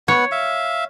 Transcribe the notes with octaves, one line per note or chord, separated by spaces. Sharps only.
B3 C#5 F#5
E5 F5